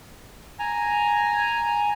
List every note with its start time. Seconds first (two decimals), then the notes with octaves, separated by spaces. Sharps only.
0.59 G#5 A#5